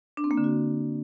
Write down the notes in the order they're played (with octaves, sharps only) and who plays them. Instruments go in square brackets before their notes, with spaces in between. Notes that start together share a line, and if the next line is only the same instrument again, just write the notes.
[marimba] D4
C4
A#3
D3
F#4